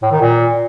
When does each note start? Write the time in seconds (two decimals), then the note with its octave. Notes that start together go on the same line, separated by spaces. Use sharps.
0.02 A2
0.12 D#3
0.21 A#2